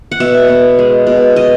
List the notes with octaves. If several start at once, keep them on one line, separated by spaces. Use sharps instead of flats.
F#5
B2 E5
B3
G#3
B2
B2 D#5